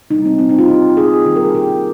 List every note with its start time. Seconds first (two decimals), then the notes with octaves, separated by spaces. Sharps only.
0.10 C3 G3 A#3 D#4
0.25 C4
0.39 C4
0.49 D#4
0.58 F4
0.68 G4
0.97 G#4
1.25 D#3 G3 A#3 G4
1.36 A#4
1.45 G#4
1.55 G4